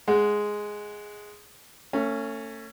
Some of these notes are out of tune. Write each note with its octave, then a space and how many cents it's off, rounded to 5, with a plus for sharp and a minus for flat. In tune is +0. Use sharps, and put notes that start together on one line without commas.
G#3 +0 F#5 +0
A3 +40 C#4 +0